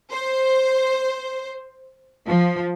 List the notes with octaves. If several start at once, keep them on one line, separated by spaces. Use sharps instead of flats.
C5
F3